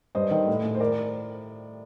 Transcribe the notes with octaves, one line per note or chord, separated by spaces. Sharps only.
G2 C5 D#5
D#3
A2
A2
C5
A#4 D5